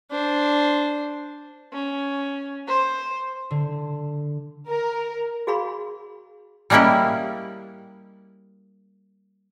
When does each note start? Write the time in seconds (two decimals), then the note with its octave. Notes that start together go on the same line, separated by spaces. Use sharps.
0.11 D4 C5
1.72 C#4
2.67 C5
3.51 D3
4.68 A#4
5.47 F#4 G#4 F5 B5 C6
6.70 G3 G#3 A#3 C#4 E4 G4